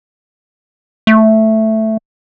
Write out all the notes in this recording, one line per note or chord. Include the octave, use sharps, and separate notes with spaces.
A3